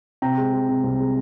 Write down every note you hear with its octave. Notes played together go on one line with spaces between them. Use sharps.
C3 G5 A#5
G#3
G#3
C3
C2
G#3